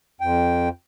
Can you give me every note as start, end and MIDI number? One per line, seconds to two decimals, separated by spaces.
0.21 0.69 41
0.21 0.69 79